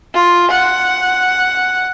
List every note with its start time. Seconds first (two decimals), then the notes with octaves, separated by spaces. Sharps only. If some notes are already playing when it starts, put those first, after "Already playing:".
0.14 F4
0.51 F#5